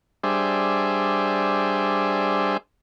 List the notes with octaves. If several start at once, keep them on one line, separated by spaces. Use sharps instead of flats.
G3 D4 G#4 C5 E5